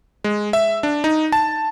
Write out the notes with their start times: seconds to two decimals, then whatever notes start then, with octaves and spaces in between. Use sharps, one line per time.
0.24 G#3
0.53 E5
0.83 D4
1.04 D#4
1.32 A5